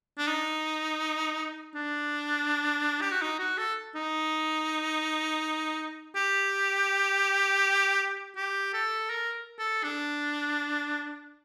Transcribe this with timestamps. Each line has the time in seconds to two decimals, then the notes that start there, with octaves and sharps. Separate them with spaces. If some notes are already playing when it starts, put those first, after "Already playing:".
0.18 D4
0.27 D#4
1.74 D4
3.01 G4
3.11 F#4
3.22 D#4
3.39 F#4
3.58 A4
3.95 D#4
6.16 G4
8.36 G4
8.73 A4
9.10 A#4
9.59 A4
9.83 D4